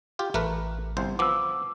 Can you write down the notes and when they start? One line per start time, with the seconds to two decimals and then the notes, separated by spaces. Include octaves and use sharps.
0.19 F4 G4
0.34 A1 A3 A#4 B4
0.97 G1 C2 C5
1.19 F3 B3 D6 E6